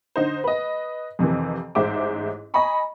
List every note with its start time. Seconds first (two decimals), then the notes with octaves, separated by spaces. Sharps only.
0.16 D3 D#4 C5
0.44 B4 D#5
1.19 F2 C3 D#3 E3
1.75 A1 G#2 G#3 C5 E5 D6
2.54 D#5 G#5 A#5 B5 C#6